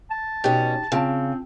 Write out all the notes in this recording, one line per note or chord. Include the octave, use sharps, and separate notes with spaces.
A5
B2 C#4 D#4 G4
C#3 C4 F4 G5 A5